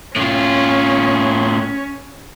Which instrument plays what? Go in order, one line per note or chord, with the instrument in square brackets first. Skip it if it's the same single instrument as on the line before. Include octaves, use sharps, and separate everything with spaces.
[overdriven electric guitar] A2 F4 [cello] C#4